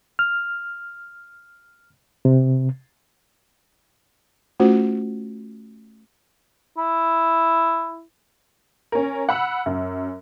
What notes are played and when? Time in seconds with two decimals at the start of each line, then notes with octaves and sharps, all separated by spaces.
0.19 F6
2.25 C3
4.60 A3 C#4 F4 F#4 C5
6.78 E4
8.92 C#4 A#4
9.29 F#5 B5 E6
9.66 F#2